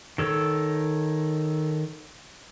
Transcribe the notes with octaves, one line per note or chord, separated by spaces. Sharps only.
D#3 A4 C#5 E6